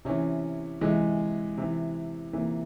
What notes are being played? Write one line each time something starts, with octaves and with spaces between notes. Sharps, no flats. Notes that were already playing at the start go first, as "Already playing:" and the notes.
C3 E3 C#4
C3 E3 G#3
C3 E3
C3 E3 A#3